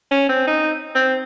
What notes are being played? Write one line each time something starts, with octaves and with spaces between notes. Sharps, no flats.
C#4
C4
D#4
C4